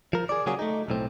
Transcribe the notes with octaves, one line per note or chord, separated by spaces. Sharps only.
F3 A#4
G#4 D5
C#3 F#3 A#3 C#4 F#4 G#4
A3 D#4
B1 A2 C4